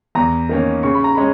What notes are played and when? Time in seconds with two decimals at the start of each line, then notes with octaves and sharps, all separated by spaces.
0.15 E2 A#5
0.49 D#3 A#3 C#4
0.83 C#3 C#6
0.95 B5
1.04 A#5
1.15 G#3 C#4 B5